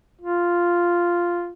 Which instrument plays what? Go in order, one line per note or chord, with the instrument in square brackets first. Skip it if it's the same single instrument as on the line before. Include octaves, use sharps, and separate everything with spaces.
[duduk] F4